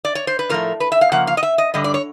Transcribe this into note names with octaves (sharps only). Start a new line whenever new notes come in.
D5
C#5
C5
B4
A2 F3 A3 A#4
B4
E5
F5
C#3 F3 A#3 F#5
F5
D#5
E5
D#5
G2 D3 G3 D#5
D5
C#5